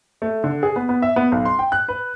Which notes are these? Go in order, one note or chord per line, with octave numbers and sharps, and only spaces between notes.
A3
D3
G#4
B3
B3
E5
B3
B1
C6
G5
F#6
B4